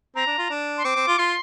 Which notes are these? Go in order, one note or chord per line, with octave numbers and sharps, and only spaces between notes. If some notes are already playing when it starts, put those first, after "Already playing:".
C4 A#5
D4
F4
D4
C6
C4 D6
C4
F4
F4 C6